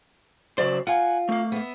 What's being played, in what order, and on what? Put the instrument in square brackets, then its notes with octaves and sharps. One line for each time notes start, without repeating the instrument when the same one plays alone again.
[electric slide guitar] C#3 F#3 C5 [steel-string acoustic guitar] D5 E5
[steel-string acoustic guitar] F4 [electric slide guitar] F#5 G#5
[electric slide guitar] A3 F5
[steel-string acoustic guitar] B3 E5